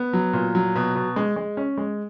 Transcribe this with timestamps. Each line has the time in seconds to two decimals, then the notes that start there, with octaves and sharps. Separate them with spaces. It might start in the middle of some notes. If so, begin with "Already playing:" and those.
Already playing: B3
0.13 F#3
0.33 A#2
0.55 F#3
0.75 B2
0.95 B2
1.16 G#3
1.36 G#3
1.57 C#4
1.78 G#3